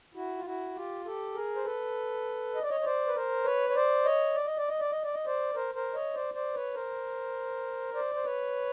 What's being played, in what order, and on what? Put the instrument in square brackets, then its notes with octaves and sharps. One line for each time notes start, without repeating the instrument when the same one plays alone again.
[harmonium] E4 F#4
F4
E4 F#4
F4 G4
G4 A4
G#4 A#4
C5
A4 B4
D#5
D5
C#5 D#5
C#5
C5 D5
B4
A#4 C5
B4 C#5
C#5
C5 D5
C#5 D#5
D5
D#5
D5
D#5
D5
D#5
D5
D#5
C5 D5
A#4 C5
A#4 C5
C#5 D#5
C5 D5
C5 D5
B4 C#5
A#4 C5
C5 D5
C5
B4 C#5